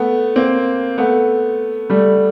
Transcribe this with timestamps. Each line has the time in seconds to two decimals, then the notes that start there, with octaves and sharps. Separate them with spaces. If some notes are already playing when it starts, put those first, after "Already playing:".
Already playing: A3 B3
0.36 A#3 C4
0.98 A3 B3
1.90 G3 A3